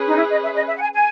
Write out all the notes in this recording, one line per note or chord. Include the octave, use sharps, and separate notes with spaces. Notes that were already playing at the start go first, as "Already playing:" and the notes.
Already playing: C#4 G#4 B4
D#4
E4
D#5
E5
D#5
E5
F#5
G#5
G#5